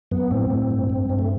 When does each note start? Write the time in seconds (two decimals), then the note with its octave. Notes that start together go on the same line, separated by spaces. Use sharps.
0.11 F#2 B3
0.31 A2 C4
0.51 A2
0.70 G2
0.90 G2
1.09 G2 C4
1.19 A3